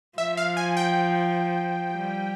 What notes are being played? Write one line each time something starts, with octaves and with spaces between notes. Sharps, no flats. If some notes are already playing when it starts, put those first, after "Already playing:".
F3 E5
F5
G#5
G5
G3